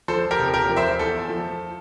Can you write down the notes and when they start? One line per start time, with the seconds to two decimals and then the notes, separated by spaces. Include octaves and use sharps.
0.08 F3 A4 C5
0.31 G4 A#4
0.38 F1
0.54 G4 A#4
0.69 F3
0.76 C5 E5
0.99 E2 A4
1.29 F3